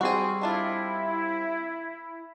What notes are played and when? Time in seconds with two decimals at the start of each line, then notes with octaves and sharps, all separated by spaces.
0.01 G3 C4 F#4 G#4
0.42 D#3 D4 E4 F4